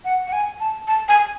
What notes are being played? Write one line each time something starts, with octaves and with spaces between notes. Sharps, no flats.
F#5
F#5
G#5
A5
A5
G#5